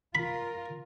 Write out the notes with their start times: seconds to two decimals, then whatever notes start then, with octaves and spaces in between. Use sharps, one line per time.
0.15 F4 A#4 B5